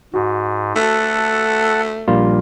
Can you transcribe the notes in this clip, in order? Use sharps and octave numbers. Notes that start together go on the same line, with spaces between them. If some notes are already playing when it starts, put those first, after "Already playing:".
G#2 F#4
A3 A4 F#5
A#1 G3 A#3 F4